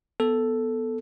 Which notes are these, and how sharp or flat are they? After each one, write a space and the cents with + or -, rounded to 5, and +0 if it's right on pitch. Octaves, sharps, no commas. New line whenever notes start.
B3 +0 A4 +0